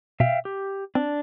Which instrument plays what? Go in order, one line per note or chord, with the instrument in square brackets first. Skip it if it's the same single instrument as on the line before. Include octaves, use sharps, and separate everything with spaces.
[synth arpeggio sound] B2 [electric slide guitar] E5 F5 G5
[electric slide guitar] G4
[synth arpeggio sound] C4 [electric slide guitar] D4